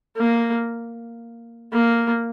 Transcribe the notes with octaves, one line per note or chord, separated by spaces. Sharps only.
A#3
A#3